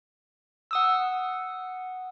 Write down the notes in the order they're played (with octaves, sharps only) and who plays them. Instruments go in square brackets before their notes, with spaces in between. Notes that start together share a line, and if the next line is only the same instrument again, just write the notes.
[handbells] F#5 D#6 E6